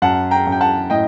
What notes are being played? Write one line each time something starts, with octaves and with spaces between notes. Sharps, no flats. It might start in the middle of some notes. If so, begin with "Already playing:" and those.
F#2 F#5 A5
G5 A#5
F#2
G5
F#5 A5
A2 D#5 G5